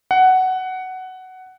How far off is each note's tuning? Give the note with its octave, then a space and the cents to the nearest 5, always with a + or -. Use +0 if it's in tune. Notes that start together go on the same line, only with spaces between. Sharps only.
F#5 +10